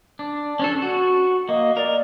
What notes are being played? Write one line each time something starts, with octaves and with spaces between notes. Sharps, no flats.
D4
C#4 D4 A4
F#4
A#3 D#5
A#4 D5